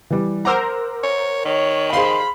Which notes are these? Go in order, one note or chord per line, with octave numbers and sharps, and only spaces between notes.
E3 G3
A#4 C5 F#5 A#5 D6 E6
C#5
D#3 C#5
G#4 C5 F5 B5 C6